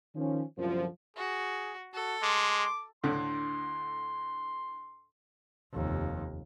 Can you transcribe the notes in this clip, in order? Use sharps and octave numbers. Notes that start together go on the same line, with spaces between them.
D#3 F3 C#4
C2 F#2 A#2 D3 F3
F#4 G#4
F#4 A4
G#3 C6 D6
D2 A2 D3 C6
F1 D#2